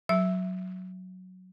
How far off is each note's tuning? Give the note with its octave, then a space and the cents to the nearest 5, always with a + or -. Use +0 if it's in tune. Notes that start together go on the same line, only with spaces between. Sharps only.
F#3 +0 E5 +0